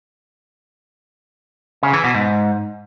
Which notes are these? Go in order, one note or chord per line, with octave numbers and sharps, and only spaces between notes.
C#3
E3
B2
G#2